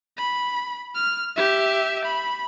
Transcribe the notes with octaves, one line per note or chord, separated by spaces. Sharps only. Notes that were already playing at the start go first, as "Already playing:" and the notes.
B5
F6
G4 E5
B5